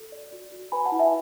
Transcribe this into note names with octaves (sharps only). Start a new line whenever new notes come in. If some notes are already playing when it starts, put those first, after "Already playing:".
Already playing: F#4 A4
D5
F#4
F#4
B4 G#5 B5
F#5 A5
E4
E5 G#5